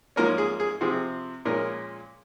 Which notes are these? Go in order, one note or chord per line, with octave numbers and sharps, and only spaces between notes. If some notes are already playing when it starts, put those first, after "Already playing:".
G#2 F3 A#3 C#4 A#4
G#4
G#4
C3 F3 C4 G#4
A#2 F3 G#3 C#4 A#4